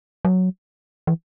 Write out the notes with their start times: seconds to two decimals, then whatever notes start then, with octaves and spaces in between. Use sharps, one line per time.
0.25 F#3
1.07 E3